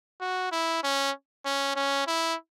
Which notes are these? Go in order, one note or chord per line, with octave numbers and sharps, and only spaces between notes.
F#4
E4
C#4
C#4
C#4
E4